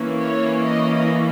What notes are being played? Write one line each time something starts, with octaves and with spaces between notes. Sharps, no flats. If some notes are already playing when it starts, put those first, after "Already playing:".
Already playing: E3 A#3 C#4
C#5
D#5